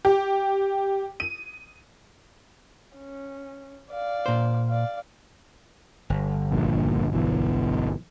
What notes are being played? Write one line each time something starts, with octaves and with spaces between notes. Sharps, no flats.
G4
D#7
C#4
D5 F5
A#2 C5
D5 F5
G1
A#1 G2 A#2
B1 B2 E3